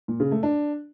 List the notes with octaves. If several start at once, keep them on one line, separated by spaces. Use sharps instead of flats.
A#2
C#3
A3
D4